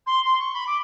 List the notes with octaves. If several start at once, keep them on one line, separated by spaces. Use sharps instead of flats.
C6
C6
C#6
B5
D6